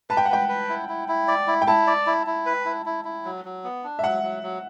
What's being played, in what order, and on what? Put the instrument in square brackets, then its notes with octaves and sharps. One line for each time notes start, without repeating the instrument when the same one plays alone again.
[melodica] B4 [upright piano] A5
[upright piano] G5
F#5
[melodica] B4 [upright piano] G5
[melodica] B4
E4
E4
E4
D5
E4
[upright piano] G5
[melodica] E4 [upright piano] A5
[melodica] D5
E4
E4
B4
E4
E4
E4
F#3
F#3
B3
D4
[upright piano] E5
[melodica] F#3 [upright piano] F#5
[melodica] F#3
F#3